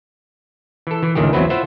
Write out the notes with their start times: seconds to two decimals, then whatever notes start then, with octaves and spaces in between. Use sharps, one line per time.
0.87 E3 A4
1.03 E3
1.15 C#2 G2 A#2 D#3 A3 G4
1.33 A1 E2 F#3 C4 E4 B4
1.50 E4 F4 C5 E5 F#5